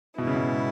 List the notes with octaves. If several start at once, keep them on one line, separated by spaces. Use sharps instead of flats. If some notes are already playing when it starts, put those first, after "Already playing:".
G#2 B2 G#3 B3 E4
C#3
B2